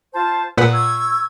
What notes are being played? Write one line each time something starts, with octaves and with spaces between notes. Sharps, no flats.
F4 C5 A5
A#2 G#4 B4 F#5
C#6 E6 G#6